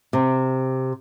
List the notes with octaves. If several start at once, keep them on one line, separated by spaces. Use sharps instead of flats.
C3